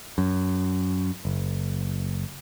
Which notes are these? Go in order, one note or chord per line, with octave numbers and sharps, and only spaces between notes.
F#2
F#1